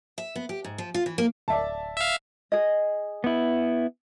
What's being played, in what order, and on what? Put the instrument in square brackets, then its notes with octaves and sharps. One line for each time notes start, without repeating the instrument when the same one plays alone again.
[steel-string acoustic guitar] E5
B3
G4
G#2
F3
F4
E3
A#3
[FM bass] D1 [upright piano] D5 E5 A5
[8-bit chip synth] E5 F5
[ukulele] G#4 D#5
[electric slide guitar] B3 E4